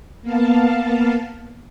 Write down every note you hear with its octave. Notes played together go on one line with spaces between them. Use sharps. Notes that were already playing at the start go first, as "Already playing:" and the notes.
A#3 B3 F5 A5